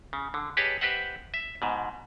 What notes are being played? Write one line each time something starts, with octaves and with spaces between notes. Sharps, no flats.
C#3
D3
G4 G#4 B4 C#5 D#5 A5
G4 B4 C5 D#5 E5 F#5
E5
G#2 B2